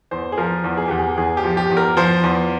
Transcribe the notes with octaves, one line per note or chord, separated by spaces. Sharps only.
E2 C5
G#4
F3 A#4
E2
G#4
E2 G4
G#4
E2 G#4
G4
F3
G4
E2
A#4
F3 C5
E2